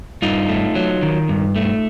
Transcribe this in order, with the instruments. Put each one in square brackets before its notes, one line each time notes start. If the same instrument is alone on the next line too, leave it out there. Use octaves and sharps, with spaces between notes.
[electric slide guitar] G2 D#4 F4
A3
F#3
D#3
G2
A3